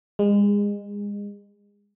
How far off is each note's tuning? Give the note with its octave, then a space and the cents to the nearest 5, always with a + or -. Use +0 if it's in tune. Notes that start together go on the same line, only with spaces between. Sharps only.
G#3 -30